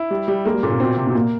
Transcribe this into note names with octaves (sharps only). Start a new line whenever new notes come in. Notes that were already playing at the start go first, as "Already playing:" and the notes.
Already playing: E4
G3
G3
G#3 A#3
G3
A#2 C#3
C3
B2 C4
C3
B2
A#2 A#3